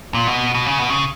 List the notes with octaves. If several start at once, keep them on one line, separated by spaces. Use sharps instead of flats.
A#2
B2
B2
C#3
B2
C#3